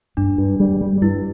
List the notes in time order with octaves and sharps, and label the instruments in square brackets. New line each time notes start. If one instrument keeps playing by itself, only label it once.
[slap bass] G2 [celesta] D4
[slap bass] G2
G3
G3
[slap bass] G2 [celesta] E4